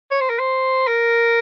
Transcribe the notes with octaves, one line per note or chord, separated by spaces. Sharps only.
C#5
C5
A#4
C5
A#4